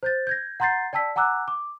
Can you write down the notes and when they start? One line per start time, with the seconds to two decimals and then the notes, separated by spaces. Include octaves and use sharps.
0.03 C5 G6 A6
0.27 G6 G#6 A#6
0.60 F#5 A#5 C6 G6 A6 C7
0.93 D5 G5 A5 E6 B6
1.16 F#5 G#5 A#5 D6 E6 F#6
1.48 D6